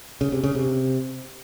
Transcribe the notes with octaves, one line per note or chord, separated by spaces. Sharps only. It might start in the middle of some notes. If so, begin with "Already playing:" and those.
C#3
C3
C#3
C3